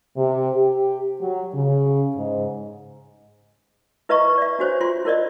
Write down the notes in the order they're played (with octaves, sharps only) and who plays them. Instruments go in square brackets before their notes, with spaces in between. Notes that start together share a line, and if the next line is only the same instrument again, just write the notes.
[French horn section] C3
G4
F#3
C#3
G#2
[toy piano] E4 B4 D#5 E5 A#5 C#6
D5 E5
D4 F#4 C5 C#5
F4 C6
E4 A#4 D5 D#5